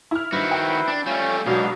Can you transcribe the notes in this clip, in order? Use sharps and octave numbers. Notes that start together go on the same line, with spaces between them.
E4 F6
G2 D#3 E4 F#4 B4 C5
G5
D4
G3 A3 C#4 F4
G#2 B2 F#3 B3 D4 F5